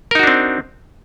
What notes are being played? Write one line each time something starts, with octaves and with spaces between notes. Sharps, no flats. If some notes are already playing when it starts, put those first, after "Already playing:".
C4 D4 D#4 F#4 A#4